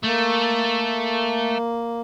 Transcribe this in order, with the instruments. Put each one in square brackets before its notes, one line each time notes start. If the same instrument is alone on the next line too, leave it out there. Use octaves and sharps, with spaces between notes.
[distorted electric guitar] A3 [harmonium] A#3